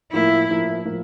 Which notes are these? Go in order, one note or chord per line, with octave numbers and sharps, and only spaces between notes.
A2 F3 A#3 E4
A2 F3 A#3
A2 F3 A#3